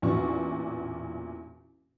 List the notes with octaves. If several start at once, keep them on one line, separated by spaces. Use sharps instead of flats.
A1 E2 A#2 D4 F#4 C#6